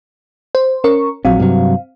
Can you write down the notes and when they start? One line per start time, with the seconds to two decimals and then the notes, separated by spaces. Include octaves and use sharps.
0.55 C5
0.84 C#4 A#4 C#6
1.25 A#1 F#3 C4 F5
1.40 G2 C3 F#3